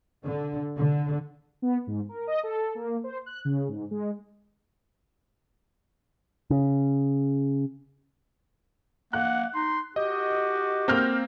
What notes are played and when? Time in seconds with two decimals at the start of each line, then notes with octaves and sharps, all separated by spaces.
0.24 D3
0.76 D3
1.62 B3
1.87 G#2
2.09 A#4
2.27 D#5
2.43 A4
2.75 A#3
3.04 C5
3.26 F#6
3.45 C#3
3.68 G#2
3.91 G#3
6.50 C#3
9.13 A#3 F#5 F#6
9.55 D#4 C6
9.96 F#4 G4 D#5
10.88 A#3 C4 F6 G6 A#6